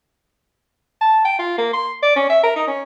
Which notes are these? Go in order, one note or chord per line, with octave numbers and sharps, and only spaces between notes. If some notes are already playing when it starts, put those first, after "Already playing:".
A5
G5
F4
A#3
C6
D5
C#4
E5
A#4
D#4
C#4